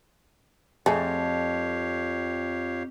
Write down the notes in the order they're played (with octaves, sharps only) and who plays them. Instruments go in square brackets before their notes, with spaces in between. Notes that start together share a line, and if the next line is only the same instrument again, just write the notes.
[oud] F2 [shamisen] A3 G#4 [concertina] G4 C#5 F5